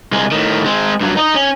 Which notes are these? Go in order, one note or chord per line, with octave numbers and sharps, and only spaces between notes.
C2 G#3
A2 D#3
G#3 C4
G2 F#3
D#4 D#5
C#4